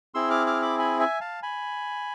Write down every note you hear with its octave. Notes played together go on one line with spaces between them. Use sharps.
C4 E4 G#4 C6 E6
D6 F6
D6 F6
B5 D6
G#5 B5
E5 G#5
F5 A5
G#5 B5